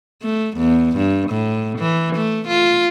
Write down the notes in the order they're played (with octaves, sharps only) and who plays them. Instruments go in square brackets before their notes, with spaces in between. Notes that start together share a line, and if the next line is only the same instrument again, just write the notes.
[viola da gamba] A3
E2
G2
A2
E3
A3
F4